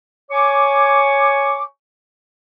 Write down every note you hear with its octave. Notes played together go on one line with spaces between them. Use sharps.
C#5 G#5 C#6 D6